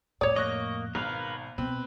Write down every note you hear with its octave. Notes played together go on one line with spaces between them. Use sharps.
F2 A2 C#5 D5 D#6
A#3 D#5 C#6 F#6 A#6
G#1 B2 A#4 B4 F5
B2 C4 B4